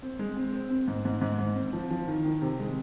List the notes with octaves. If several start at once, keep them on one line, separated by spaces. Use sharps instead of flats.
C4
G#3
C4
C4
C4
G#2
G#2
G#2
G#2
C4
F3
F3
D#3
D#3
C3
G#3